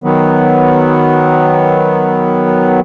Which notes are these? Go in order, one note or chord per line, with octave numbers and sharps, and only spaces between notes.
D#3 F#3 B3